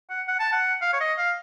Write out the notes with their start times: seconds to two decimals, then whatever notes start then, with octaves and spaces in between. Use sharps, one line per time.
0.10 F#5
0.28 F#5
0.40 A5
0.52 F#5
0.82 F5
0.93 C#5
1.00 D#5
1.18 F5